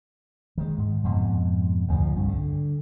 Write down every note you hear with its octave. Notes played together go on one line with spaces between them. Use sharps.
D#3 G#3
G#2
F2 G#2 B2
D2 C#3 E3 F3
C2 G2
D3